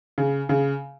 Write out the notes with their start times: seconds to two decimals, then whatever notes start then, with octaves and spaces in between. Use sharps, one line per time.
0.18 C#3
0.49 C#3